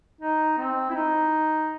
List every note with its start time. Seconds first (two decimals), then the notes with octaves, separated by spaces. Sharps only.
0.21 D#4
0.58 C4
0.90 E4
0.95 D#4